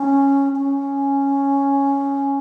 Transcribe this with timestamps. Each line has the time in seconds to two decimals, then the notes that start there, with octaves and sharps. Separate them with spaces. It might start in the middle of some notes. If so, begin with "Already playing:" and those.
Already playing: C#4
0.56 C#4